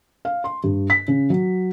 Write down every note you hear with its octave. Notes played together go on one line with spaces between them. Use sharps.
F5
C6
G2
B6
C#3
F#3